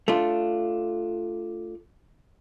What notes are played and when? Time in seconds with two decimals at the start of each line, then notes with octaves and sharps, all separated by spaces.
0.08 A3 D4 F4